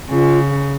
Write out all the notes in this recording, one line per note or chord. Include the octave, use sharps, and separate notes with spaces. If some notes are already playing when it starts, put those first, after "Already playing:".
C#3 F4